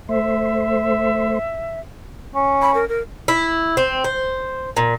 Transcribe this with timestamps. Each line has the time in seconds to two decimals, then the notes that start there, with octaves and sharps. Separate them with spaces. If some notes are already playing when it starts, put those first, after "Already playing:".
0.09 A3 C5 E5
2.35 C#4
2.62 B5
2.75 A#4
2.89 A#4
3.28 E4
3.77 C4
4.04 C5
4.77 A#2